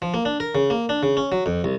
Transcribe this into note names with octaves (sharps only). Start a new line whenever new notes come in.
F3
A#3
D4
A#4
C#3
A#3
D4
C#3
C#4
F#3
F2
C2